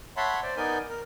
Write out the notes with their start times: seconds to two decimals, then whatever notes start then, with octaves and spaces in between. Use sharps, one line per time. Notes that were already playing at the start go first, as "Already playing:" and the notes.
0.17 C#5 E5 F#5 A5 B5 C6
0.43 C5 D5
0.57 B3 D#4 A#4 D5 G#5 G6
0.89 A#4